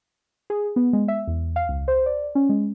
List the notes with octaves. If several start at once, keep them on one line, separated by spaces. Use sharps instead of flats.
G#4
B3
G#3
E5
E2
F5
C#2
C5
D5
C#4
G#3